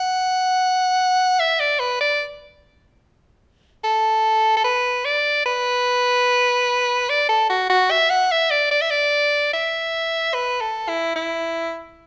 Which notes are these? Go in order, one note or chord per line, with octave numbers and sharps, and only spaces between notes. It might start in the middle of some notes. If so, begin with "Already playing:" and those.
Already playing: F#5
E5
D5
B4
D5
A4
A4
B4
D5
B4
D5
A4
F#4
F#4
E5
F#5
E5
D5
D5
E5
D5
E5
B4
A4
E4
E4